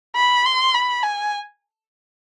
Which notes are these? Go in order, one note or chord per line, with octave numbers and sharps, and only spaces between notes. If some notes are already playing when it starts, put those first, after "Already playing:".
B5
C6
B5
G#5